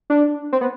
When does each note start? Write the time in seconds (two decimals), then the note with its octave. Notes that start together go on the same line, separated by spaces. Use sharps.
0.10 D4
0.53 C4
0.61 B3